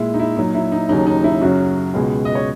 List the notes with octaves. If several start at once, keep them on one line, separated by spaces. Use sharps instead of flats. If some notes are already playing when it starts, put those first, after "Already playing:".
Already playing: A#2 G#3 E4
D#4
E4
A#2 F#3 D#4
E4
D#4
D#2 C#3 F#3 D#4
D#4
E4
F#2 C#3 F#3 F#4
C#2 B2 G#3
D#5
C#5